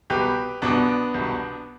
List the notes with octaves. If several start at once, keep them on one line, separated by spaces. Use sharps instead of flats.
C2 B2 G4 B4
C2 B2 B3 D4
C2 B2